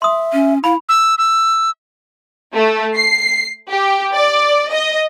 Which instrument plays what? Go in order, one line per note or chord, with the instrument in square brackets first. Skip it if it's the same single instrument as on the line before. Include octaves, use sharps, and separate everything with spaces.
[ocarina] E5 [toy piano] C6 D#6
[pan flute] C#4
[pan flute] E4 [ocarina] F5 [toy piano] B5
[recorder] E6
E6
[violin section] A3
C7
G4
D5
D#5